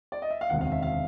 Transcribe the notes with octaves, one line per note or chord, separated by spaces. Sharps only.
D5
D#5
E5
F5
E1 D2 C3 D#3 F#5
F5
E5
F5